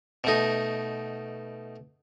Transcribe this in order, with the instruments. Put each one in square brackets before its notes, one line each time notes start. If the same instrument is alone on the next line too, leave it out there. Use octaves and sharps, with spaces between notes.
[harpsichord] B2 A3 D#4